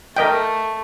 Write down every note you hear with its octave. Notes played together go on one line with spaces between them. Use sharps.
A3 A#4 D#5 G5